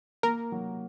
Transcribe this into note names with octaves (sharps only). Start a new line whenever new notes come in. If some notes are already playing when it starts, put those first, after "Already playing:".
A#3 A#4
F#3